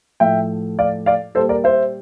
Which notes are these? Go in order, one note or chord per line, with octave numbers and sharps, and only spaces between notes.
A2 F3 E5 G5
D5 F5
D5 F5
A#2 G3 A4 C5
A#4 D5
C5 E5